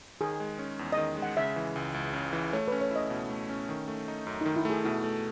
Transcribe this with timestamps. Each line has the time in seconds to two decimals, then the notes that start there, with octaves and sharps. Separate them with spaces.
0.21 D#3 G#4
0.40 G#3
0.59 C#4
0.79 E2
0.92 D#3 D#5
1.17 G#3
1.22 F#5
1.37 C#3 E5
1.56 E3
1.76 C#2
1.94 C#2
2.13 C#3
2.33 E3
2.53 A3 C#5
2.68 C#4 B4
2.81 C#5
2.91 E4 D#5
3.10 B2
3.30 A3
3.49 C#4
3.69 D#3
3.88 A3
4.08 D#4
4.27 F#2
4.41 D#3 D#4
4.56 E4
4.65 A3 G#4
4.84 B2 E4
5.04 A3